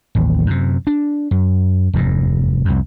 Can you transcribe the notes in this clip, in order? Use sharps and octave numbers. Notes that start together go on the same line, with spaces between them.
A1 D#2
F#2 C3
D4
F#2
F1 E2 G2
C2 F2